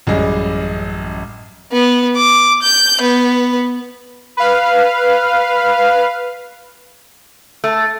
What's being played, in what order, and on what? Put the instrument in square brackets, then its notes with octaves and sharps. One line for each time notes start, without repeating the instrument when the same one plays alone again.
[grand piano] A1 F#2 G3 G#3 G#4 D#5
[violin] B3
D6
G6
B3
[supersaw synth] B4 F5
[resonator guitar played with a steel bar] A3